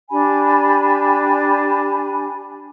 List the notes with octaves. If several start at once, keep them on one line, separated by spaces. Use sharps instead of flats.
D4 G4 G#5 B5